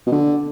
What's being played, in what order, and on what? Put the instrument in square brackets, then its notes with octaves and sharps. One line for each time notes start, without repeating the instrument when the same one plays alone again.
[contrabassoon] B2
D3